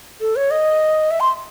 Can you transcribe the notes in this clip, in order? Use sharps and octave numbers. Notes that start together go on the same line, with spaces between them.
A4
C#5
D#5
E5
C6